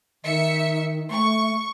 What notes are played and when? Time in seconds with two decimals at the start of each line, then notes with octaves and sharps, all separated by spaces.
0.24 D#3 E5 C#7
1.10 A3 C#6